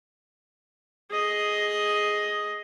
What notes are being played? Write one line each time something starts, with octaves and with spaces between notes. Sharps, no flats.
G#4 D#5